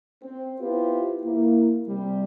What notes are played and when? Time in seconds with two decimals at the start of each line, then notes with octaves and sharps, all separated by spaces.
0.23 C4
0.60 B3 E4 F4 G4 B4 C5
1.24 A#3 E4
1.88 C3 G3